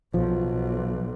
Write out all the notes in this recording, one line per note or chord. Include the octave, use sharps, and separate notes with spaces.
B1 F3